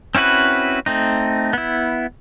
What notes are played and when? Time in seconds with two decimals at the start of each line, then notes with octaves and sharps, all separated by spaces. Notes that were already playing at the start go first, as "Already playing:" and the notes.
0.15 C4 C#4 E4 F#4 B4
0.86 A3 C4 D#4
1.53 B3 E4